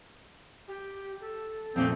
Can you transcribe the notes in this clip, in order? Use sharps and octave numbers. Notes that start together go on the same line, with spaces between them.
G4
A4
F2 A#2 A3 C4